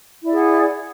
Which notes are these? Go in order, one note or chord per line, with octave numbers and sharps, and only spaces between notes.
E4 G#4 D5 F#5